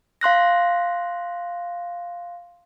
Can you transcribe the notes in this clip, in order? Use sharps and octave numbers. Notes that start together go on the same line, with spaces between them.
F5 C6 F#6 A#6